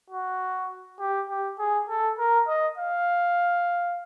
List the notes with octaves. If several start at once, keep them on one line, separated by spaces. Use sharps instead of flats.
F#4
G4
G4
G#4
A4
A#4
D#5
F5